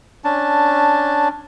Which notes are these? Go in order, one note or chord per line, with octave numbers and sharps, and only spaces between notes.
C#4 D4 A5